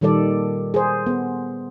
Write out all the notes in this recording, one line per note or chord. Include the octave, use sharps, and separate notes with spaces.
A#2 D#3 G3 A4 D5
G#4 C5
B3